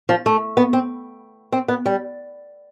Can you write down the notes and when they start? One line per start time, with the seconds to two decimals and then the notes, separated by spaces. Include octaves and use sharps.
0.09 F3
0.26 A3
0.57 B3
0.73 C4
1.52 C4
1.68 B3
1.86 G3